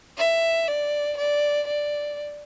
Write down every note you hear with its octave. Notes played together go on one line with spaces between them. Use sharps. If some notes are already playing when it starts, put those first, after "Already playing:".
E5
D5
D5
D5